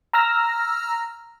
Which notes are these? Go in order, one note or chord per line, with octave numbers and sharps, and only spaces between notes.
A#5 E6 F6 A#6